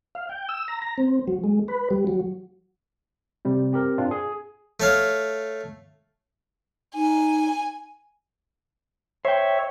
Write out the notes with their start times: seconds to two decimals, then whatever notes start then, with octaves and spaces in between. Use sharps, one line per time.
0.15 F5
0.29 G5
0.49 E6
0.68 A#5
0.82 A#5
0.98 C4
1.27 F#3
1.44 G#3
1.68 B4
1.91 G3
2.07 F#3
3.45 C3 G3 C4
3.73 C4 G4 A#4
3.98 C4 D4 F4
4.11 G#4
4.80 A3 C#5 F5
6.95 D#4 G#5
9.25 C5 C#5 E5 G5